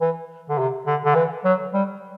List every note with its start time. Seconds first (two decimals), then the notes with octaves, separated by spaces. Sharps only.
0.01 E3
0.49 D3
0.58 C3
0.86 D3
1.05 D3
1.15 E3
1.44 F#3
1.73 G3